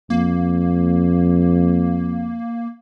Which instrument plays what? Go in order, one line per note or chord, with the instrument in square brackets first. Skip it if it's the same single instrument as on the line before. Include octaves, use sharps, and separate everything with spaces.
[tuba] F2 [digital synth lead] A#3